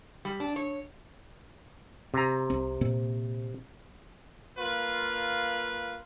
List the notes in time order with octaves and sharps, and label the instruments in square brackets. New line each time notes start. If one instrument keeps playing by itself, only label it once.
[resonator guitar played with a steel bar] G3
D4
C#5
[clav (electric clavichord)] C3 A#5
[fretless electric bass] C2 C4
A#2 A#3 C4
[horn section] A#3 F4 B4